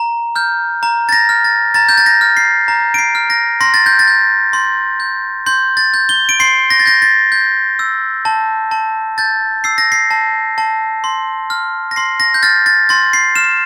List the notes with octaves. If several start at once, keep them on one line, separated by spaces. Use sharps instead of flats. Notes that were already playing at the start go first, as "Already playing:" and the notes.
Already playing: A#5
F6 G6
A#5
A6
A#6
F6
A6
A#5 A6
G6
A6
A#6
F6
C7
A#5
D7
C7
F6
A#6
C6 A#6
A6
G6
A6
G6
C6
G6
C6 G6
A6
G6
G7
D7
C6 C7
A#6
A6
G6 A#6
A6
G6
E6
A5
A5
G6 A6
E6 C7
A#6
C7
A5
A5
C6
F6
A#6
C6 C7
A#6
G6
F6 A6
A6
C6 A6
C7
F6 E7